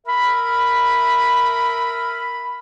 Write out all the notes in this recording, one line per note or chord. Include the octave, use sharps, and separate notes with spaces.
A#4 E5 B5